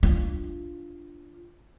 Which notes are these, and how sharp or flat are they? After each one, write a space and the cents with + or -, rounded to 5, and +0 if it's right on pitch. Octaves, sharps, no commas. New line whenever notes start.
D4 +0 F4 -10